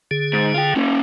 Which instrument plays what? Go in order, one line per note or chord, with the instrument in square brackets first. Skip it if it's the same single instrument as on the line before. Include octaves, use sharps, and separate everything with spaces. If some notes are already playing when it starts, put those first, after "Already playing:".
[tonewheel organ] D3 G#4
[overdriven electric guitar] G#2
F4 G5
A#3 C#4